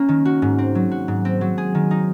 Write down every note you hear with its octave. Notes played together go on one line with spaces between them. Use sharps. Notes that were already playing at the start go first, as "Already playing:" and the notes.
Already playing: A#3 C#4
D#3
F#4
G#2
C4
F#3
F#4
G#2
C4
F#3
G#4
D#3
D#4